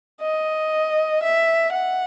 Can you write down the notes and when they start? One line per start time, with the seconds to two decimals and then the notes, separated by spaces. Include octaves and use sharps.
0.22 D#5
1.23 E5
1.72 F#5